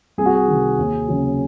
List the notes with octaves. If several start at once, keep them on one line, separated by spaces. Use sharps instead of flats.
C2 G#4
F#4
G#4
C3 D#3
D#2
C#3 F#3